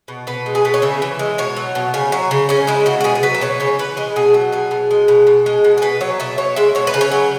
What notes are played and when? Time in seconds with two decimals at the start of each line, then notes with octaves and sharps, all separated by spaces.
0.08 B2
0.27 B2 B4
0.46 G#3
0.55 G#4
0.65 B2 B4
0.74 C#5
0.82 C#3 E5
1.02 E3
1.19 G#3
1.38 B2 C#5
1.57 F#3
1.75 B2
1.94 C#3 C#5
2.12 F#3 C#5
2.31 C#3
2.49 C#3 C#4
2.67 G#3 E4
2.86 C#3 F#4
3.01 F#4
3.04 B2 G#4
3.15 G#4
3.23 F#3 B4
3.34 E5
3.41 B2 C#5
3.60 C#3 C#5
3.78 E3 B4
3.97 G#3 G#4
4.16 B2 G#4
4.34 F#3
4.52 B2 G#4
4.71 B2
4.91 G#3
5.08 B2
5.27 B2
5.46 G#3
5.64 B2
5.78 G#4
5.82 B2 B4
6.01 F#3 C#5
6.20 B2 E5
6.38 B2 C#5
6.56 G#3 E5
6.75 B2 C#5
6.87 B4
6.94 C#3
7.01 C#5
7.12 F#3